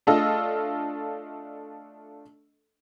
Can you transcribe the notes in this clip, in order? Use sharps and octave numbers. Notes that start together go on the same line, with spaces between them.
A3 D4 F4 A4 D#5